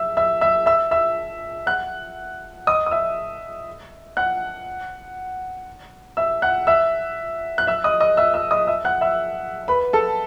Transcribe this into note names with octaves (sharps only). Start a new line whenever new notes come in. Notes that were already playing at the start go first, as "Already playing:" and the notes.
Already playing: E5 E6
E5 E6
E5 E6
E5 E6
E5 E6
F#5 F#6
D#5 D#6
D#6
E5 E6
F#5 F#6
E5 E6
F#5 F#6
E5 E6
F#6
E5 E6
D#5 D#6
D#5 D#6
E5 E6
E5 E6
D#5 D#6
E5 E6
F#5 F#6
E5 E6
B4 B5
A4 A5